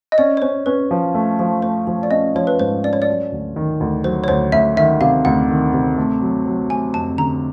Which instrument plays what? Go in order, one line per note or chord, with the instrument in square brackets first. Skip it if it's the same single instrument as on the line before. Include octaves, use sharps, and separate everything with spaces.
[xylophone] D#5
[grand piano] C#4 [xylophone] D5
[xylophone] C#5
[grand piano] C#4 [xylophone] C5
[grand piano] C#4 [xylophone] B4
[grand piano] F3
A3
F3
[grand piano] A3 [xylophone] C5
[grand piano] F3
[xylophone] D5
[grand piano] C#4 [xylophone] D#5
[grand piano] F3 [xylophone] C#5
[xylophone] B4
[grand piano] G#2 [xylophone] C5
[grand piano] C#4 [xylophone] D5
[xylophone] C#5
D5
[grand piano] F#3
D2
D#3
D2
[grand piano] F#3 [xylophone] C5
[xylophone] C#5
[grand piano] D2 [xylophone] C5
[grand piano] D2 [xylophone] E5
[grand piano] D#3 [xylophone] E5
[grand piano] C3 [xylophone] F5
[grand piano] D2 [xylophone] F#5
[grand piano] D#3
C3
A3
F#3
F#3
[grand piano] A3 [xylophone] G#5
[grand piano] F2 [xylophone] A5
[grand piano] D3 [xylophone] A#5